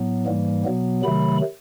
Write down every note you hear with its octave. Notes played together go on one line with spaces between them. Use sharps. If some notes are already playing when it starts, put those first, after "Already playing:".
Already playing: A2 F#3 B3
G#2 E3 G3 A#3
B2 F#3 B3
C3 D#3 F#3 A3 B5